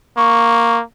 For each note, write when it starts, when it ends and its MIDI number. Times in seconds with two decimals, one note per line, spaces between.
0.17 0.82 58
0.17 0.77 85